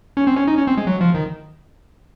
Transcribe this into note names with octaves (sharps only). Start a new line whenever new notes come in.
C#4
C4
C#4
D#4
C#4
C4
G#3
F#3
F3
D#3